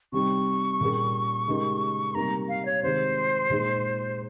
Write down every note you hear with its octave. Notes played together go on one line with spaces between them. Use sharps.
C3 G3 C4 D#4 C#6
A#2 G3 A#3 C#4 G#4
C#3 G#3 D#4 G4 A#4
C3 G3 A#3 D#4 A#5
F5
C#5
C3 D#3 G#3 C5
A#2 G#3 D#4 G#4